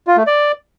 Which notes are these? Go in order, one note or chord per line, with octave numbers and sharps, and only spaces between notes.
F4
A3
D5